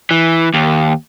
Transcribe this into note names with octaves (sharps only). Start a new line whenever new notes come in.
E3
D#2